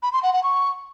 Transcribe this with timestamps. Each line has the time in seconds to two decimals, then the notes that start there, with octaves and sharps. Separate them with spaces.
0.03 B5
0.13 C6
0.23 F#5
0.33 F#5
0.43 C#6